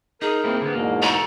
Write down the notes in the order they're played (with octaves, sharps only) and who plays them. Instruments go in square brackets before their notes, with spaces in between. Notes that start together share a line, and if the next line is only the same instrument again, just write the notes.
[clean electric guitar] D#4 [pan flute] G#4 [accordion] A#4
[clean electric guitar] A#3 C4 E4
D3 B3
[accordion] E2 G#2 B2 [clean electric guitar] A#3
[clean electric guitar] A4 C#5 [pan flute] A#5